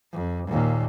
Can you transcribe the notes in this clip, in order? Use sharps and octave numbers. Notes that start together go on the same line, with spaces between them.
F2
D#2 A#2